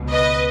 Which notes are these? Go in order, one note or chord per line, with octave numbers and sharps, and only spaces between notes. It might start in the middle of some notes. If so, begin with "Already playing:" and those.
Already playing: C#2 B2
B4 D#5